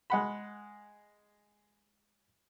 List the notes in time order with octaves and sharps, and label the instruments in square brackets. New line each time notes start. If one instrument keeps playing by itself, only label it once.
[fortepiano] G#3 F#5 B5